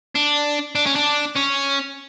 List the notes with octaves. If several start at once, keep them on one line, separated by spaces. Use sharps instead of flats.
D4
D4
C#4
D4
C#4